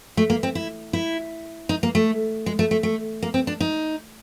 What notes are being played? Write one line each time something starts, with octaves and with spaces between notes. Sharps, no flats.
A3
A#3
C4
E4
E4
D#4
A#3
A3
G#3
A3
A3
A3
A#3
C4
D4
D#4